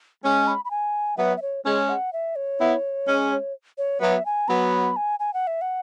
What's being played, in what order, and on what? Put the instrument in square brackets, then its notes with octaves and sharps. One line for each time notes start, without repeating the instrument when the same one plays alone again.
[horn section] G#3 C#4 [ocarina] G#5
[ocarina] B5
B5
G#5
[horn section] F#3 B3 [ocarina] E5
[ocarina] E5
C#5
[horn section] G#3 C#4 [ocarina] C#5
[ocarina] F#5
E5
C#5
[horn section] B3 E4
G#3 C#4
[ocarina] C#5
[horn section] F#3 B3 [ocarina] E5
[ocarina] G#5
[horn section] F#3 B3 [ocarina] B5
[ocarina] G#5
G#5
F#5
E5
F#5